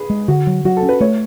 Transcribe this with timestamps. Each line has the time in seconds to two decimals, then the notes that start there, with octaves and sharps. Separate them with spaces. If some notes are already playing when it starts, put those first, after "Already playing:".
Already playing: G#4 B4
0.10 G#3
0.28 D3 F#4
0.47 F#3
0.65 F#3 F#4
0.77 A4
0.83 C#4
0.89 B4
1.01 A3 C#5